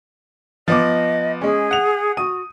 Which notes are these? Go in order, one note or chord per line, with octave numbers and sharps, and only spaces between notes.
F3 B3 D#5 D6
G#3 C#4 G#4
F#5 F7
F#4 D#6 D#7